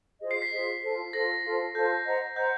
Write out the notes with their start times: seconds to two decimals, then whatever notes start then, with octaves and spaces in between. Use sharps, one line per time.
0.21 F4 G#4 C5 D#5
0.31 C7
0.42 B6
0.51 F4 G#4 C5 D#5
0.83 F4 A4 C5
1.13 F4 A4 C5 A#6
1.44 F4 A4 C5
1.75 F4 A4 C5 G6
2.05 C5 D#5 F#5 A#5
2.36 C5 D#5 F#5 A#5 G6